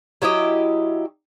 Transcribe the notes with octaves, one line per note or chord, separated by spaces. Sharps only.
F#3 E4 G4 D#5